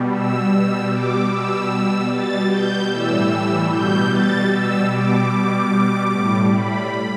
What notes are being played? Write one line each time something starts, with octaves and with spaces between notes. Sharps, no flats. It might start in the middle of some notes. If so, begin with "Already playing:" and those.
Already playing: B2 G3
E6
B2 G3
D6
B2 G3 E6
B2 G3 A6
G6
A2 E3 G3 E6
B2 G3 G6
A6
B2 G3 E6
D6
B2 G3
A2 G3
B5